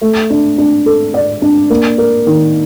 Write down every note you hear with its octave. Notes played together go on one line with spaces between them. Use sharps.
A3
D4
D4
A4
D5
D4
A#3
A#4
D#3